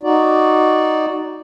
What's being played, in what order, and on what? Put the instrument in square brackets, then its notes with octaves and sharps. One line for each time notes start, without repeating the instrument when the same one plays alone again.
[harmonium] D#4 F#4 D5